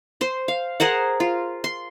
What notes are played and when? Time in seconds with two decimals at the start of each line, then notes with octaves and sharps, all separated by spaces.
0.21 C5 C6
0.48 F5
0.80 G#4 A#4 C5 F#5
1.20 F4
1.64 C6